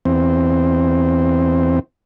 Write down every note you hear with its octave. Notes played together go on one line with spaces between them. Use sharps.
E2 C4